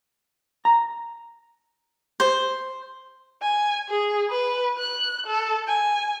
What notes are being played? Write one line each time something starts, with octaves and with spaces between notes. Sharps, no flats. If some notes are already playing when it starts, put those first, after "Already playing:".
A#5
C5
G#5
G#4
B4
F#6
A4
G#5